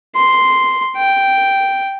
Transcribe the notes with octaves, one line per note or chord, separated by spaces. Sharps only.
C6
G5